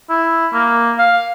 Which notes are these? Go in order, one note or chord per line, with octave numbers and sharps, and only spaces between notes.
E4
A#3
F5